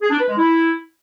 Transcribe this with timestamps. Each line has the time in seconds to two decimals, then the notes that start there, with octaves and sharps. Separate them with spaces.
0.01 G#4
0.10 D4
0.19 B4
0.28 G#3
0.37 E4